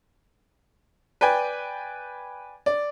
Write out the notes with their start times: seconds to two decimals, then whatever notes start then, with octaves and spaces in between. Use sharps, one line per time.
1.21 B4 D5 G5 G#5
2.66 D5